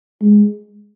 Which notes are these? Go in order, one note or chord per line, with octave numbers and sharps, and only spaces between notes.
G#3